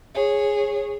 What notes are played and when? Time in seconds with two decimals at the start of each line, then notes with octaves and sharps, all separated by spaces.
0.15 G#4 C#5